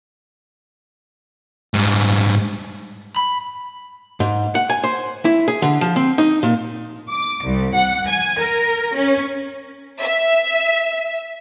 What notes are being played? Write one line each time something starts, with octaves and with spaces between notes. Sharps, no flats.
G#2 G3
B5
G#2
F#5
G#5
C5
E4
G#4
D3
F3
C4
D#4
A#2
D6
C2
F#5
G#5
A#4
C#4
E5